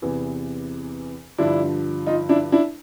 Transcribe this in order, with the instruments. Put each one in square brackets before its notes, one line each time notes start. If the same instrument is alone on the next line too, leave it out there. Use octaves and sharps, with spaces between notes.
[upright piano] E2 C3 E3
G2 D3 F3 D4 E4
D#4 F4
D4 E4
D4 E4